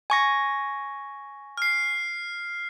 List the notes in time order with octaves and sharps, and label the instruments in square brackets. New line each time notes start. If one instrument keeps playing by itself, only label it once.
[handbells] G#5 C#6 A#6
[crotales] F6 C7